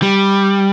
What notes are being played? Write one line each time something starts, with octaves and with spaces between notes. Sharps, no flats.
G3